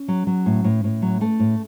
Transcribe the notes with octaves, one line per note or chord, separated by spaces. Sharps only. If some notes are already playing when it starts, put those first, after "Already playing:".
Already playing: C#4
F#3
F#3
A2
A2
A2
F#3
A3
A2